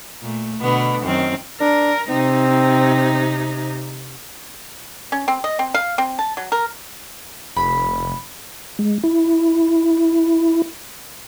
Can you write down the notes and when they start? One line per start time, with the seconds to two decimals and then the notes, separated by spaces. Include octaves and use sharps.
0.22 A#2 A3
0.59 B2 D3 B3
1.02 F#2 D#3 C4
1.60 D4 A#4
2.09 C3 C4 D#4
5.12 C#4
5.28 C4
5.44 D#5
5.59 C4
5.74 F5
5.98 C4
6.19 A5
6.37 F#3
6.52 A#4
7.56 F1 B5
8.79 G#3
9.04 E4